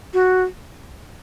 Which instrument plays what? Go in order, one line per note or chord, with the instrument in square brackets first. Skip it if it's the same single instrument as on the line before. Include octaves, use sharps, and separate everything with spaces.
[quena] F#4